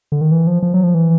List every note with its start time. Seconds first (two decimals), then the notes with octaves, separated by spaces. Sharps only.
0.12 D3
0.21 D#3
0.31 E3
0.47 F3
0.62 F3
0.74 F#3
0.84 F3
0.94 E3